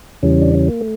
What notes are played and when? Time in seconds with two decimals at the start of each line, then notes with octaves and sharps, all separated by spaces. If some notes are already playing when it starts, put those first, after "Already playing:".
0.23 E2 C#3 E3 G3 C#4
0.42 D4
0.55 C#4
0.68 A#3
0.81 A3